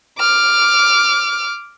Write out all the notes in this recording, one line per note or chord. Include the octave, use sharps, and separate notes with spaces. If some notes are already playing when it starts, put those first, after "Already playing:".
D6 F6